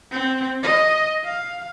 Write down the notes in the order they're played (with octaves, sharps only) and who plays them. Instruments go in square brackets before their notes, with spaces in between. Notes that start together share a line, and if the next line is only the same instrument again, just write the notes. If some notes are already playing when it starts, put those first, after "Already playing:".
[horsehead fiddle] C4
D#5
F5